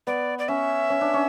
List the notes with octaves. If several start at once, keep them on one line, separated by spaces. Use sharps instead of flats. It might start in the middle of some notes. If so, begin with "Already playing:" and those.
B3 D5
D5
C#4 E5
C#4
D4
C#4